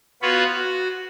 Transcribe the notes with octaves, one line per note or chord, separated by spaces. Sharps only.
B3 F4 F#4 B4 C#5
F#4